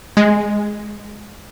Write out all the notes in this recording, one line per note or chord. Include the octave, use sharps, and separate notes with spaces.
G#3